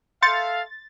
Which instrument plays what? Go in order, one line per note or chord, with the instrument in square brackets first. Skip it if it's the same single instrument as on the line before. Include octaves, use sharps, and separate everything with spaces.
[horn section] A4 E5 F5 [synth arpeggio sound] C6 G6 C#7 [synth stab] A6